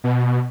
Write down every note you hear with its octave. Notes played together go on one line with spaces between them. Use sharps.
B2